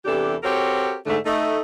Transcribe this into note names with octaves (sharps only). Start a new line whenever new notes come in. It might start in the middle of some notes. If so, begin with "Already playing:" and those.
E2 C3 E3 D4 G4 A4
C4 F#4 G4 A4 A#4 C#5
G#2 D3 A3
A3 D#4